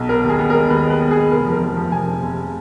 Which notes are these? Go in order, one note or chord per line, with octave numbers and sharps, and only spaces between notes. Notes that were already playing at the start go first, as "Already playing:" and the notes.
Already playing: B1
B3 A#4
D#2
G#4
B3
G#3 A#4
D#2 B4
G#3 B4
B3
G#3 G#4
F1 A#4
F3
A#4
F1
F3
F1 G#5
F1
F1